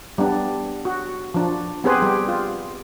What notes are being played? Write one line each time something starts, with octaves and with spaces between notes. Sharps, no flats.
G3 B3 D4
F#4
F3 D4
B3 C4 G4 G#4 B4 C5
G3 G4
F4